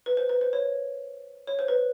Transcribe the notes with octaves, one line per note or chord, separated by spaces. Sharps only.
B4
C5
B4
C5
C#5
C#5
C5
B4